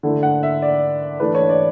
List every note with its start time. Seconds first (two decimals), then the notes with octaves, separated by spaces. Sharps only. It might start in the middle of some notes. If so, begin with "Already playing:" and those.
0.03 D3 A3 E4
0.23 F#5
0.43 E5
0.62 D5
1.20 E3 A3 D4 B4
1.35 C#5
1.49 D5